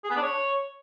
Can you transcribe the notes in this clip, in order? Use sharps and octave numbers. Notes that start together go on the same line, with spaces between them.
G#4
B3
D4
C#5